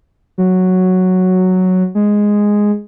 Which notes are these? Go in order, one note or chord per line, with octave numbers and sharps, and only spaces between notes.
F#3
G#3